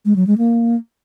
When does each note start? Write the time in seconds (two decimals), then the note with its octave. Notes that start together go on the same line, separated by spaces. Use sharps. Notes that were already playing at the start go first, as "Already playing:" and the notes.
0.05 G#3
0.16 F#3
0.27 G#3
0.38 A#3